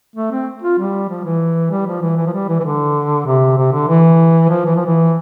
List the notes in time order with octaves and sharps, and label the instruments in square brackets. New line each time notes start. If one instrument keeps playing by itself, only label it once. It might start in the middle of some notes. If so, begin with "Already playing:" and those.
[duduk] A3
C4
F4
G3
F3
E3
G3
F3
E3
E3
F3
G3
E3
E3
D3
C3
C3
D3
E3
F3
E3
F3
E3